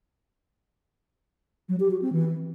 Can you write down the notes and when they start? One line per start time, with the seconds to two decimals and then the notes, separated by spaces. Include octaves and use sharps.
1.69 F#3
1.80 G4
1.91 F#4
2.02 C4
2.13 E3